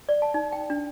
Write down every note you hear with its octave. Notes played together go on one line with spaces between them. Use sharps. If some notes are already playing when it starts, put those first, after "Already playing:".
D5
A5
D#4
G5
D4